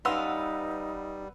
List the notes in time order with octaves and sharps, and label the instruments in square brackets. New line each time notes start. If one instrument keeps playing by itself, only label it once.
[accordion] G3 [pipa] G#3 C#4 F4 [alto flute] D#4 [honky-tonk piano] B4 F#5 E6